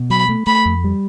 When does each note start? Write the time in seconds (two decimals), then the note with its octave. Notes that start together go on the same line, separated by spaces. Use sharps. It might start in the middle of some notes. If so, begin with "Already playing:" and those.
Already playing: B2
0.10 F#3 B5
0.29 A3
0.47 A3 B5
0.65 F2
0.84 G3